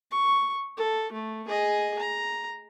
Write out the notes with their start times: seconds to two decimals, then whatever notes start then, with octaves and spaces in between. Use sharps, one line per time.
0.11 C#6
0.77 A4
1.12 A3
1.48 G#4 D#5
1.99 A#5